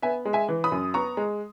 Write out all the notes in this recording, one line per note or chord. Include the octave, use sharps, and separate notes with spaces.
B3 E5 G#5
G#3
E5 G#5
E3
B5 D#6
F#2
B3 A#5 C#6
G#3